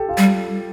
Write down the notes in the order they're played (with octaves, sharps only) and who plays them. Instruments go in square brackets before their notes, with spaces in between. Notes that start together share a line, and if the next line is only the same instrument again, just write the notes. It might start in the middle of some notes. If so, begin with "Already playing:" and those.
Already playing: [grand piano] G4 A4
F4
[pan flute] G3